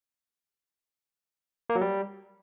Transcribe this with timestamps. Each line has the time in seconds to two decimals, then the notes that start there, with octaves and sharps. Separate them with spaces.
1.70 A#3
1.75 F#3
1.81 G3